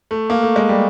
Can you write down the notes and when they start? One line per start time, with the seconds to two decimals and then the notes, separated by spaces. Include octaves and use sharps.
0.11 A3
0.30 A#3
0.42 A3
0.56 G#3
0.69 G3